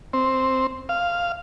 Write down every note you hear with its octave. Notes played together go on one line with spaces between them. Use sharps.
C4
F5